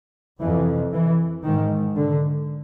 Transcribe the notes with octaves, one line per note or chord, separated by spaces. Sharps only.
F2 C3 E3
E3
G#2 D#3
D3